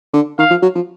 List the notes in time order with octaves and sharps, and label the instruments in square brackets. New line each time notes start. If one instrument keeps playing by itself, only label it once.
[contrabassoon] D3
[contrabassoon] D#3 [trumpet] F5
[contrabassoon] F3
F#3
F3